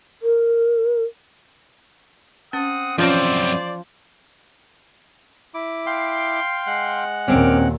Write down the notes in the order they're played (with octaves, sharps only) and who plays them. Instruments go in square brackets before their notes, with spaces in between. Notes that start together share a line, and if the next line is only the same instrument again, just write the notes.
[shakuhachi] A#4
[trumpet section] C4 F#5 D#6 [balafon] C#4
[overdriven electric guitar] F#2 C4 [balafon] E3 C#4 F4 [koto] F3 [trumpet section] C5 D5
[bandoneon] E4 D6
[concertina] F5 G5 C6
[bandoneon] G#3 F#5
[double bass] D#2 A#2 [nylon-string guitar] C4 C#4 [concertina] D6 F6